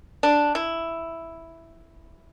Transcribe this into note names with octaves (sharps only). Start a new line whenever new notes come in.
D4
E4